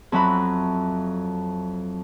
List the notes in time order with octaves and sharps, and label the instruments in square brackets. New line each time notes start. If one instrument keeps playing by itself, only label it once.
[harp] F2 F#3 E5 B5